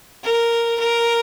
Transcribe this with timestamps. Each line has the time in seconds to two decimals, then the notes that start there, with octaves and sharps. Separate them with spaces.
0.23 A#4
0.79 A#4